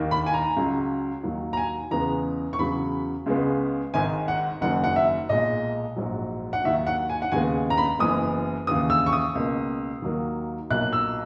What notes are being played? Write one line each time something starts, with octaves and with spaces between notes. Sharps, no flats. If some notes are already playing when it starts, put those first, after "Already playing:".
Already playing: D#2 D#3 A#3
B5
G#5
A#5
C#2 C#3 F#3
D#2 D#3 F#3
A#5
G#5
E2 C#3 G#3 B3 A#5
C#6
E2 C#3 F#3 B5
C#2 C#3 G#3 B3
G#1 G#2 D#3 G#5
F#5
F#1 F#2 D#3 F#3 F#5
F#5
E5
B1 A#2 G#3 D#5
A#1 G#2 F#3
F#5
D#2 D#3 F#3 E5
F#5
G#5
F#5
D#2 C#3 G#3 B3 G#5
A#5
B5
F#1 F#2 E3 B3 D#6
D#2 C#3 E3 D#6
E6
C#6
D#6
C#2 B2 A#3
D#2 D#3 F#3 A#3
B1 A#2 F#3 A#3 F#6
E6